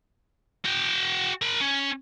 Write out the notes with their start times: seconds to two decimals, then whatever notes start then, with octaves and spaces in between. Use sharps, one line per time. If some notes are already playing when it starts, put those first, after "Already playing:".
0.65 F#4 G5
1.42 A#4 B5
1.60 C#4